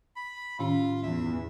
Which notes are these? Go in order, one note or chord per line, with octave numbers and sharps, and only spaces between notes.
B5
A2 D#3 C#4 F4
E2 E5